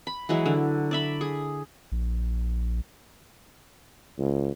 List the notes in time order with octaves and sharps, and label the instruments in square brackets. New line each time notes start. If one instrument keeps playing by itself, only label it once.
[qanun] B5
E3 F#3 G#3 E4
D3
D5 E5 B5
G#4
[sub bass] A#1
[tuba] C#2